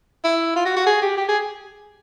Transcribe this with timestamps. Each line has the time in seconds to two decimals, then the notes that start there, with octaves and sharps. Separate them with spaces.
0.24 E4
0.56 F4
0.66 F#4
0.76 F#4
0.87 G#4
1.02 G4
1.17 G4
1.29 G#4